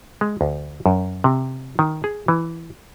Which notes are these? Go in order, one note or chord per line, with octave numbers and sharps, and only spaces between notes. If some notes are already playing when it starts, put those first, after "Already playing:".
G#3
D2
F#2
C3
D#3
G#4
E3